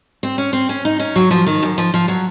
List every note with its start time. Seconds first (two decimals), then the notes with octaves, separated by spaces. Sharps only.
0.23 C4
0.38 C#4
0.53 C4
0.69 C#4
0.85 D#4
0.99 C#4
1.16 F#3
1.31 F3
1.46 D#3
1.63 F#2
1.78 F3
1.94 F3
2.08 F#3